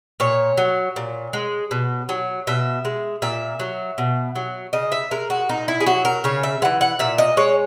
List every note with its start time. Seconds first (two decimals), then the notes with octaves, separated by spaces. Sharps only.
0.20 A#2 C#5
0.57 F#3
0.96 A#2
1.33 G#3
1.71 B2
2.09 F#3
2.47 B2 E5
2.85 G#3
3.22 A#2 E5
3.60 F#3
3.98 B2
4.36 F#3
4.73 C#3 D#5
4.92 E5
5.11 G#3 A#4
5.30 F#4
5.49 A#2 D#4
5.68 E4
5.80 G#4
5.86 F#3 F#4
6.05 A#4
6.24 C#3 C#5
6.43 E5
6.62 E3 G#3 F#5
6.81 F#5
6.99 A#2 E5
7.18 D#5
7.37 G#3 C#5